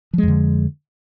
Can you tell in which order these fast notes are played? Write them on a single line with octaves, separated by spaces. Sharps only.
F3 G#3 F2 D3